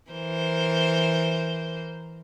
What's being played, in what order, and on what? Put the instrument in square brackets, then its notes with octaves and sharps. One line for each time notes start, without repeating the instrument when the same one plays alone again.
[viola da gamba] E3 A#4 C5